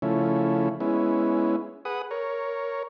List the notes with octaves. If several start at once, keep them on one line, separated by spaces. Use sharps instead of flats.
C#3 F3 A3 C#4 E4
G#3 B3 C#4 E4
G#4 B4 F#5 D#6
A#4 C#5